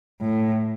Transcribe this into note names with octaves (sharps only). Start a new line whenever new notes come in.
A2